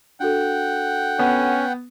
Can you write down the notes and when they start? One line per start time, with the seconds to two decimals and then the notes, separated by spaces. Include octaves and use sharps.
0.20 D4 F#4 A4 F#5 G5
1.19 B3 C#4